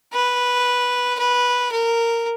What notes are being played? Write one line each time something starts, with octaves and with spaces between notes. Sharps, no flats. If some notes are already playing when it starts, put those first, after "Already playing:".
B4
B4
A#4